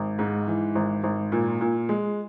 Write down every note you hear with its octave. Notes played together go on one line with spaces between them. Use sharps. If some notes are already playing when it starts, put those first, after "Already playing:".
Already playing: G#1
G#2
E3
G#1
G#1
A#2
A#2
G#3